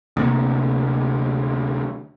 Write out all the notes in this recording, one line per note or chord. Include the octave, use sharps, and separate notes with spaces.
D2 C3 A#3